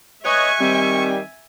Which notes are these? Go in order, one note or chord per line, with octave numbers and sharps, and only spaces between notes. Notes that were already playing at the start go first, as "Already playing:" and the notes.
B4 C#5 D#5 E5 G#5 C#6 F#6
D#3 G3 C4